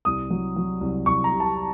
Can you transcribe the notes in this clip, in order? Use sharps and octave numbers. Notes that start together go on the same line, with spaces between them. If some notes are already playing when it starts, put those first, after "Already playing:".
C2 D#6
F#3
F#3
C2
C2 C#6
A#5
C3
A5